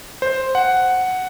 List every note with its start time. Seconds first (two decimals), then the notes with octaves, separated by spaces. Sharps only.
0.22 C5
0.55 F#5